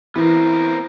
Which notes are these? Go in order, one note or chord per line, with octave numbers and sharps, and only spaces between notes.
E3 B3 C4 A#4